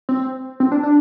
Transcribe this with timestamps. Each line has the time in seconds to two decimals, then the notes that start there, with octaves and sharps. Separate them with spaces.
0.09 C4
0.60 C4
0.72 D4
0.83 D4